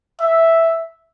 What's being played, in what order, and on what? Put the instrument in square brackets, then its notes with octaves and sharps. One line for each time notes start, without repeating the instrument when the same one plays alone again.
[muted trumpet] E5